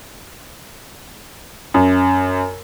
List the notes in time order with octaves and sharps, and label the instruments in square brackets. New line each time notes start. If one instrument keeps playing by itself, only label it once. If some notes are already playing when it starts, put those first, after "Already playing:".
[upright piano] F#2